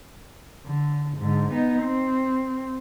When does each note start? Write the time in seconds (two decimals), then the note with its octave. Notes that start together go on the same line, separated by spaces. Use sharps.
0.66 D3
1.17 G#2 D3
1.52 B3 D#4
1.83 C4